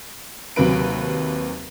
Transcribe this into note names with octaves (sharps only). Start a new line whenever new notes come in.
D#2 C3 F#3 B4 D7